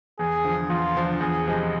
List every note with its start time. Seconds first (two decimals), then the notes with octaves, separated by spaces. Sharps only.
0.19 E2 G#4
0.44 D3 F3
0.70 E2 F4
0.95 D3 F3
1.21 E2 G#4
1.47 C3 F3 G#3